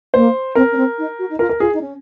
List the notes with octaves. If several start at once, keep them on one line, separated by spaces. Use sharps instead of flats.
A#3 C5
C4 A#4
C#4
C4
D#4
F#4
D#4
F4 A#4
A#4
F4 G#4
D#4
C#4